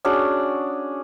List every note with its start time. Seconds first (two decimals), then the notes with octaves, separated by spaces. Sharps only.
0.05 C#4 D4 F#4 G#4